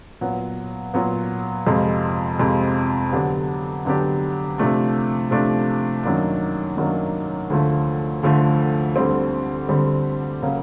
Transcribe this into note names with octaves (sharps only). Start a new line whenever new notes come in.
A#2 F#3 B3
A#2 F#3 B3
F2 C3 F3 G#3
F2 C3 F3 G#3
D3 F#3 B3 D4 G4
D3 F#3 B3 D4 G4
C3 F3 A3 D4
C3 F3 A3 D4
F#2 D#3 F#3 A#3 D4
F#2 D#3 F#3 A#3 D4
D2 D3 F3 A3
D2 D3 F3 A3
D2 D3 G3 C4
D2 D3 G3 C4
C#3 F#3 A#3